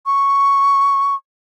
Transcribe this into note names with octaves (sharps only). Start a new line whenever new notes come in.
C#6